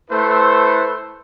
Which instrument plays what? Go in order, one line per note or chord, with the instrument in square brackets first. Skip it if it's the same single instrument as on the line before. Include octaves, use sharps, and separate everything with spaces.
[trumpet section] A3 E4 A4 B4 C5